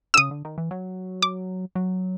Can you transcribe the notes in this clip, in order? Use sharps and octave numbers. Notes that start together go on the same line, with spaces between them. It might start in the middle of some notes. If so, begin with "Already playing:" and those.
D3 E6
C#3 D#6
D3
D#3
E3
F#3
D6
F#3